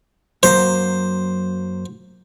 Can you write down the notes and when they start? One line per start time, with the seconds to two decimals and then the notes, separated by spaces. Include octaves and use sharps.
0.43 F#2 F#3 A#3 C5